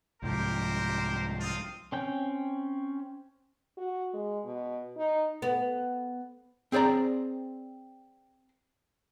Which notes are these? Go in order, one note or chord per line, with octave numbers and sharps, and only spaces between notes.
C2 G#2 F3 G4 A#4 C5
C4 F4 D#6
C4 C#4 G5
F#4
G#3
B2
D#4
B3
C4 G#4 C5 D5 A#5